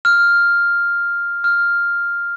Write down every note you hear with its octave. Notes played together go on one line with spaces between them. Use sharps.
F6
F6